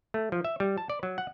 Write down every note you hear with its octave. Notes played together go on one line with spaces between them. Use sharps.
A3
F3
E5
G3
A5
D5
F#3
F#5